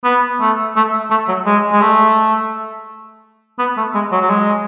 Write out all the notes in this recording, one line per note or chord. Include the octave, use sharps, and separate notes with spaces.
B3
A3
A3
A3
F#3
G#3
G#3
A3
B3
A3
G#3
F#3
F#3
G#3